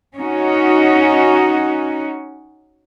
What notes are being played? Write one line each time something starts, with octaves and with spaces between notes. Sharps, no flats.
C#4 D#4 F#4